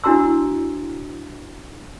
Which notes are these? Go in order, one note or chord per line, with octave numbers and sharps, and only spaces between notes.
D4 E4 F#4 A#5 C6 E6